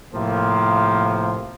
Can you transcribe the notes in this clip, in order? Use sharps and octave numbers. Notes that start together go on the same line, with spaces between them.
A2 C3 F3 A#3